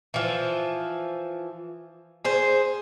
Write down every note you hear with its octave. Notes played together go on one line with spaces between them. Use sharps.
E3 F3
G#4 C5